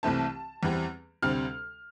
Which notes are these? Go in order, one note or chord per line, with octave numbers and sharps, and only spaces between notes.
C2 C3 E3 A3 C4 A5
E2 E3 G3 C4
D2 C3 G3 C4 F6